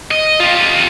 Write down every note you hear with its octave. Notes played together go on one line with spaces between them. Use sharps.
D#5
F4 G4